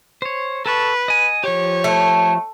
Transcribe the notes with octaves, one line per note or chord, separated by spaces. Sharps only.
C5 C#5
A4 B4 A5 C#6
D#5 G#5
F3 G4 C#5
A3